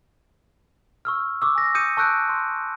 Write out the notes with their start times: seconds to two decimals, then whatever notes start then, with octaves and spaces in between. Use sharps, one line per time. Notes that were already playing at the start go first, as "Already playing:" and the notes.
1.05 C#6 E6 F6
1.42 C#6 D6 E6
1.55 G#5 A#6
1.74 D6 D#6 G6 C#7 D#7
1.97 A5 C#6 E6 F#6 G6 D7
2.29 C6